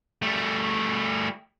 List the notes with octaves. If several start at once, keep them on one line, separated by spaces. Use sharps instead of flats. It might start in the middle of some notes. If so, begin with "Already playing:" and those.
G3 A3